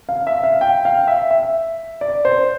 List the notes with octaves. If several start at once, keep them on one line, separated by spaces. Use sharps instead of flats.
F5
E5
F5
G5
F5
E5
E5
D5
C5